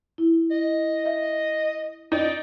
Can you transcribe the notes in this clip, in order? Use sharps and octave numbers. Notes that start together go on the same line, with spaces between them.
E4
D#5
D#5 E5
D#4 D5